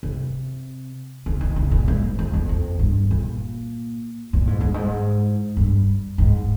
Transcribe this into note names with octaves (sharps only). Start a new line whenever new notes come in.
C3
C#3
D#3
C#3
A#2
G#2
F2
F2
F2
G2
A#2
A#2
G#2
G2
G#2
G2
G#2